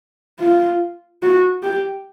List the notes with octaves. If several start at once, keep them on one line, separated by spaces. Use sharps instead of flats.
F4
F#4
G4